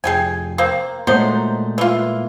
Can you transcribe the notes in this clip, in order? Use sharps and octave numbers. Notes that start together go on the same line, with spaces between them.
F1 G#4 G5 G#5
A#3 C4
A#2 F#3 G#3 A3 D#4 C5
E3 F4